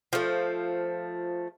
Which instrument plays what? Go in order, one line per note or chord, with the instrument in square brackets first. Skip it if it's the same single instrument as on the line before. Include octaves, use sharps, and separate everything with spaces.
[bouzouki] F3 A3